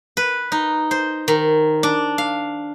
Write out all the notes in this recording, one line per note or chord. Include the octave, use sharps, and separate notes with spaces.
B4
D#4
C5
D#3
D4
F5